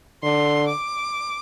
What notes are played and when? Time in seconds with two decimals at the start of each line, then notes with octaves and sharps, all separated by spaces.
0.23 D3 C6
0.68 D6